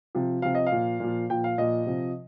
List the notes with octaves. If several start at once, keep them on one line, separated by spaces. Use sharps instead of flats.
C3 F3
C3 F3 F5
D#5
F5
A#2 F3
A#2 F3
A#2 F3 G5
F5
A#2 F3 D#5
C3 F3